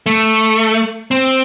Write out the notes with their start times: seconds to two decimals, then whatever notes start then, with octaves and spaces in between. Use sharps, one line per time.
0.06 A3
1.11 C4